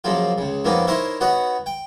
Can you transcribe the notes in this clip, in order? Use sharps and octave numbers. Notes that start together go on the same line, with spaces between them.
F#2 C#3 F3 A#3 F4
C#2 C#3
F2 D#3 A#3 B3 C#4 D#4
D#4 E4 A#4 C5 C#5 E5
B3 D#4 F#4 C#5 F#5
G5